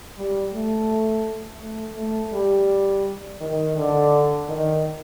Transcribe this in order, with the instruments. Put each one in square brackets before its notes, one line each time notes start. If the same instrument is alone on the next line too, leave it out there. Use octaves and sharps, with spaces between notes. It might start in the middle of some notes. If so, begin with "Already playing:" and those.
[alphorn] G3
A3
A3
A3
G3
D#3
D3
D#3